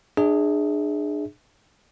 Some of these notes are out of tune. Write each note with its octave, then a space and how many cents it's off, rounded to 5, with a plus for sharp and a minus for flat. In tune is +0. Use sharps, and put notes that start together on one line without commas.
D4 +30 G#4 +0 E5 -20